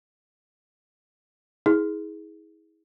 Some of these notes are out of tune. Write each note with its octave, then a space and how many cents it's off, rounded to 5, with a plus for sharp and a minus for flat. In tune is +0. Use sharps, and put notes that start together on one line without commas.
E4 -40 G#4 +0